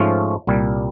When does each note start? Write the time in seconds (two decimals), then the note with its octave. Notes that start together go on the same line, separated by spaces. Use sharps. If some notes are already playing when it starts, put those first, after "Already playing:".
Already playing: G#2 F3 A3 C#4 F4
0.47 C2 A#2 G3